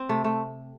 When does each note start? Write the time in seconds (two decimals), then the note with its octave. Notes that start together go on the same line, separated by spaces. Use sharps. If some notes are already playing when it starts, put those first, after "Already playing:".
Already playing: C4
0.09 C3 A3
0.24 A3